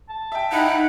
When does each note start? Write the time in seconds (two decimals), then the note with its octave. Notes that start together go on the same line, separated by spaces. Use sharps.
0.09 A5
0.32 E5 G5
0.52 D#4 E4 D#5 F#5 G5